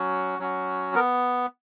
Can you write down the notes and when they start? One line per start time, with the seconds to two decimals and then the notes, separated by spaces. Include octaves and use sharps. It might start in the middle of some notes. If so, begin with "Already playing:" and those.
Already playing: F#3 C#4 F#4
0.39 F#3 C#4 F#4
0.94 B3 A#4